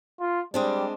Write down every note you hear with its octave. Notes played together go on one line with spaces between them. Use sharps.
F4
G3 G#3 C4 D4